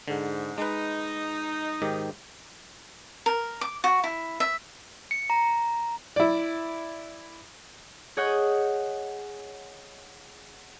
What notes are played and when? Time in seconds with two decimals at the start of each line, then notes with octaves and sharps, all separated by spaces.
0.08 G#2 D3
0.58 G#3 D#4 B4
1.82 G#2 D#3 G4
3.26 A#4
3.61 D6
3.84 F#4
4.04 E4
4.40 E5
5.11 C#7
5.30 A#5
6.16 E4 D5
8.17 G#4 C#5 D#5 F#5 D#6 G6